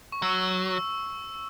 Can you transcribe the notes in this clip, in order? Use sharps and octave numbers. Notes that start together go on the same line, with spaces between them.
C#6
F#3 E6